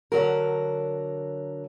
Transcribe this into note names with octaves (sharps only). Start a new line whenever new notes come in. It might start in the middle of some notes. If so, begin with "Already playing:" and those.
D3 F#3 A#4